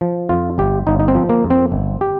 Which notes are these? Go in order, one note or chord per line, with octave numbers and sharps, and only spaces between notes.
F3
F2 F4
G1 G4
G1 D#4
D#4
C4
F3
A#3
F2
C4
G1
G4